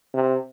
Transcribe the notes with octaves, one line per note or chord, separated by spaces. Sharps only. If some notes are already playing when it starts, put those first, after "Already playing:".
C3